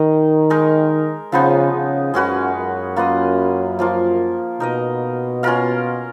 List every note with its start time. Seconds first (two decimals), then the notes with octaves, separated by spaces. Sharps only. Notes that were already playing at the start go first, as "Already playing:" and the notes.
Already playing: D#3 D#4 A#4 D#5
0.50 G#3 D#4 A#4
1.32 C#3 F3 B3 D#4
1.73 C#3
2.14 F#2 G#3 C#4 F#4 B4
2.55 F#2
2.96 A#3 F4 B4 D#5
3.79 F3 A#3 F4 A#4
4.60 B2 D#4 A#4 D#5
5.43 C#4 F4 A#4 F5